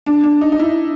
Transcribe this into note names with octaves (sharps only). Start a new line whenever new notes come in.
D4
D4
D#4
D#4
E4